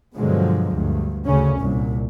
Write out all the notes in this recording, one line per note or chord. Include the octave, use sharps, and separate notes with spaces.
G2 B2 D3 F3 F#3 G#3
D2 G2
D2 C#3 C#4
C2 A#2